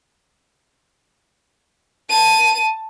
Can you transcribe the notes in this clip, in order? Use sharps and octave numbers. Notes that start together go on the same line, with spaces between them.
A5 D#7